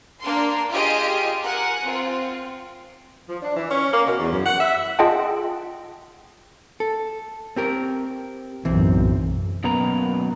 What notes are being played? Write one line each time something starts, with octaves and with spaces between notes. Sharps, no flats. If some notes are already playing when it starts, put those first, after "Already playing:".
A#3 D4 A#4 C6
F4 G4 G#4 D#5
A#4 F#5 G#5
C4 F4
F3
D4
E3
C#4
A#3
B2
E2
F#2
F#5
E5
F4 G#4 D#5 F#5 G5 A5
A4
C4 G4 A#4
B1 F#2 A2 E3 C4
F#2 B2 A#3 B4 A#5